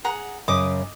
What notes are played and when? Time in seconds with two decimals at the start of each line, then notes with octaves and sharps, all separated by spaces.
0.04 G#4 F#5 A#5
0.48 F#2 C#3 D#5 D6 D#6